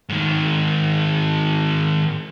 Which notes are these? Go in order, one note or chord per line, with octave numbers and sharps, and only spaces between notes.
G#2 D#3